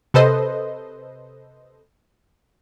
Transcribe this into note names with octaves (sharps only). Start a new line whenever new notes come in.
C3 A4 B4 C5 D#5